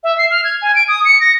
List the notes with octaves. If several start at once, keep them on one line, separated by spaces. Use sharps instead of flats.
E5
C7
F6
G#6
G#5
D7
D#6
C#7
A#6